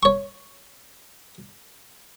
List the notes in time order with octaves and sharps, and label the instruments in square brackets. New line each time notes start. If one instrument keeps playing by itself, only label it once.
[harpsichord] C#5 C#6